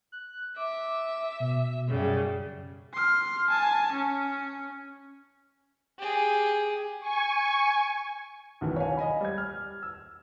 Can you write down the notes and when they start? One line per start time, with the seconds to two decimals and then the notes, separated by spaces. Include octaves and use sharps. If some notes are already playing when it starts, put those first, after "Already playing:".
0.12 F#6
0.56 E5 D6
1.40 B2
1.88 F#2 C#3 G3
2.93 C6 F6
3.50 G#5 A5
3.92 C#4
5.99 G4 G#4
7.00 G#5 C#6
8.61 B1 D#3 E3
8.76 C#5 F5 G#5
8.97 D#5 G#5 B5
9.21 G3 G#6
9.38 F6
9.83 E6